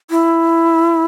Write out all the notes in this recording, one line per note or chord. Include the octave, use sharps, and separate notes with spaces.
E4